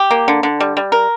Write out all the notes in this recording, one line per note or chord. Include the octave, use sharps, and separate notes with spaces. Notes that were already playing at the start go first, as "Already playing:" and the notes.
Already playing: G4
A#3
D3
D3
G3
G3
A#4